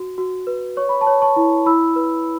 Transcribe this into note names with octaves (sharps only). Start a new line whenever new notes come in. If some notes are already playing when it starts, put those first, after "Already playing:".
Already playing: F#4
F#4
B4
C#5 C#6
B5
A5 C#6
C#5
A5 C#6
E4
E4 B5 E6
B4